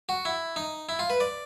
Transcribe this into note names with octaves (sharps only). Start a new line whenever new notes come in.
F#4
E4
D#4
E4
F4
B4
D5